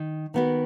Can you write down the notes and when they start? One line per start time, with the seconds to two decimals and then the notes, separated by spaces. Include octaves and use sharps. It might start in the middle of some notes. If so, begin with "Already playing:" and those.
Already playing: D#3
0.34 D#3 B3 F#4